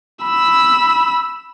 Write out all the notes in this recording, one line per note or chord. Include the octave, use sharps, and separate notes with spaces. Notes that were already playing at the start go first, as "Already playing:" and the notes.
B5 E6